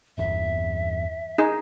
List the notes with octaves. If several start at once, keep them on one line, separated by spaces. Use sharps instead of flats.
G1 E2 E5
D#4 G#4